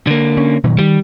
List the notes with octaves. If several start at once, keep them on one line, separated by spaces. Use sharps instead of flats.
D3 A#3
C#4
A#2 D#3 F#3
D#3 G3